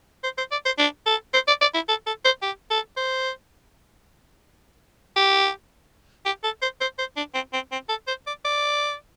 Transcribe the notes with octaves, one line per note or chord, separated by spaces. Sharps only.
C5
C5
D5
C5
D4
A4
C5
D5
D5
E4
A4
A4
C5
G4
A4
C5
G4
G4
A4
C5
C5
C5
D4
C4
C4
C4
A4
C5
D5
D5